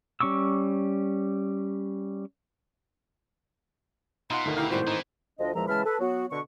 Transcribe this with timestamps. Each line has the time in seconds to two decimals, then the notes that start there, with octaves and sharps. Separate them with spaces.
0.20 G3 C#4 C#6 D6 E6
4.31 B2 D#4 F4 F#5 C6
4.45 D2 D#3
4.57 E4 G4 A#4 F5
4.71 G#1 A2 G3 F#4 C5
4.87 E3 D#4
5.40 D2 F3 D4 F4 D#5
5.55 E2 A#2 F3 G#3 E5 A#5
5.68 C#3 E3 G#3 A5 B5 F6
5.85 A4 B4
5.99 F#3 B3 F#4
6.31 B2 D3 F#4 B4 C#6